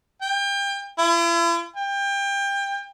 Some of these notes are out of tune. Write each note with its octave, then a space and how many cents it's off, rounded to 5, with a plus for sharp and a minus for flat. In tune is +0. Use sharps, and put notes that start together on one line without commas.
G5 +30
E4 +45
G5 +25